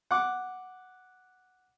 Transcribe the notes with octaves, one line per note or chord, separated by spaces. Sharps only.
F#5 D6